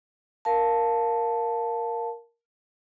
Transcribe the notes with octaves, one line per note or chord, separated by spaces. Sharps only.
A#4 F5 A5